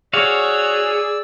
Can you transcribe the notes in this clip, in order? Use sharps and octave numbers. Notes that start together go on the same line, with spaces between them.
F#4 G#4 C#5 D5 F5 E6